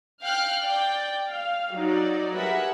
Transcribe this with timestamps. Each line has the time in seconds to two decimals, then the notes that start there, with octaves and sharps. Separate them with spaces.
0.22 F5 G5 F6 F#6
0.63 D5 G5
1.31 F5
1.74 F#3 D#4 D5
2.35 G4 G#4 A#4 B4 E5 F#5